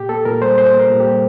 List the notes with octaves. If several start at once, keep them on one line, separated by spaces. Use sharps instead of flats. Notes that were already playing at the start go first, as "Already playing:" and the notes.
Already playing: A#2 G4
A#3 A4
A#2 A#4
G3 C5
A#2 C5
A#3
A#4
A#2
G4
G3